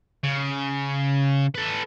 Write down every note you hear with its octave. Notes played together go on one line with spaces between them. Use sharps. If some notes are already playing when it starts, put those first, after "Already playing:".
C#3
A4 B4